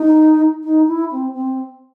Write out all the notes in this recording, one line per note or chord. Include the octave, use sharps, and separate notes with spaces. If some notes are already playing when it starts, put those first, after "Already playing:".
Already playing: D#4
D#4
E4
C4
C4